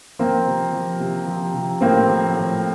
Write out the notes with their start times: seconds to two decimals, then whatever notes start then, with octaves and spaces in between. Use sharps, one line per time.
0.19 F3 A#3 C4
0.46 C3
0.73 F3
1.00 C3
1.27 F3
1.54 C3
1.81 A2 A#3 C4
2.09 F3
2.35 A2